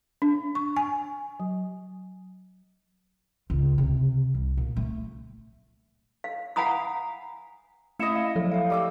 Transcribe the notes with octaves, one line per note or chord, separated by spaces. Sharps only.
D4
C#6
G#5
F#3
C#2
C3
C2
A#2
A3
F5
F5 F#5 G#5 A#5 B5 D#6
A3 E4 D#5 C#7 E7
F5
F3 F#3 A4
E5 F5
G3 D6 E6